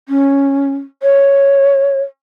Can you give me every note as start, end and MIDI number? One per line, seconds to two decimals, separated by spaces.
0.09 0.72 61
1.03 2.00 73